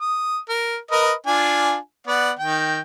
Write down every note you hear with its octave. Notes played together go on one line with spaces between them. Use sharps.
D#6
A#4
A#4 B4 D#5
D4 F4 G#5
B3 D5 F#5
D#3 G5